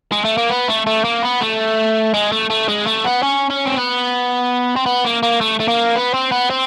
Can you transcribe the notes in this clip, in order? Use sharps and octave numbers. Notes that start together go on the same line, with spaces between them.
G#3
A3
A#3
B3
A3
A3
A#3
B3
A3
G#3
A3
A3
G#3
A3
B3
C#4
C#4
C4
B3
C4
B3
A#3
A#3
A3
A3
A#3
B3
C4
B3
C4